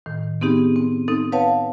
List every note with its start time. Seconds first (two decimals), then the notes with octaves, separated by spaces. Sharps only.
0.06 A2 D#3
0.41 B3 C4 D#4 G4 G#4
0.76 C4
1.08 C4 D#4 A4
1.32 B4 C#5 F5 F#5 A5